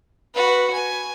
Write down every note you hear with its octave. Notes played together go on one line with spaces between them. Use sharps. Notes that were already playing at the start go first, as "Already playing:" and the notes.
F#4 B4
G#5